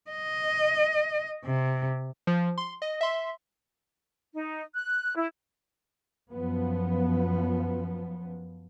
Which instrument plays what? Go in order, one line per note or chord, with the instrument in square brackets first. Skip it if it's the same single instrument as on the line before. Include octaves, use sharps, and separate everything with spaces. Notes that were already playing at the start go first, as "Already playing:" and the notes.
[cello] D#5
C3
[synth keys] F3
C6
D#5
E5 C6
[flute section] D#4
F#6
E4
[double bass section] F#2 F3 B3